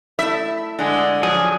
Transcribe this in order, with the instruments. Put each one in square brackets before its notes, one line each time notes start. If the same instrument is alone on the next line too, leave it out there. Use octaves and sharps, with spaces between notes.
[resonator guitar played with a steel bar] A3 E4 [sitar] E5
[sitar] D3 G#3
[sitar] F3 [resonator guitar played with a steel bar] F#3 [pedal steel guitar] G#4